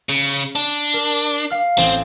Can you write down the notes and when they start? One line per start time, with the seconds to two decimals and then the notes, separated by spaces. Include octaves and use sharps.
0.09 C#3
0.55 D4
0.94 A#4
1.50 F5 F6
1.78 A1 C4